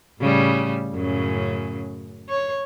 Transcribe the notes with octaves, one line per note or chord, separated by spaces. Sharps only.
A2 C#3 G3
F#2 A2 C#3
C#5